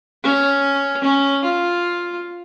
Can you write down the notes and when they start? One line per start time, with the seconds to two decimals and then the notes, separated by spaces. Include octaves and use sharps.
0.24 C#4
1.04 C#4
1.44 F4